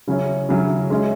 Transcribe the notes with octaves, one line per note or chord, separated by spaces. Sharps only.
C#3 F#3 C#4 E4
C#3 F#3 C#4 E4
G#3 C#4 E4